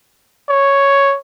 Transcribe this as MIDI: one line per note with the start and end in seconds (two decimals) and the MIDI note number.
0.49 1.16 73